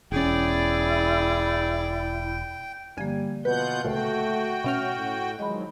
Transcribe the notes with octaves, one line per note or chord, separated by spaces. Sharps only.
E1 C#4 E4 G#4 D5 G5
G1 D3 F3 G3 A#3 G#5
B2 F4 B4 F#5 G6
C#2 A#2 A3 F#4 G5
B2 C#4 E5 F6
A2
D#3 F3 F#3 G#3 D#5 B5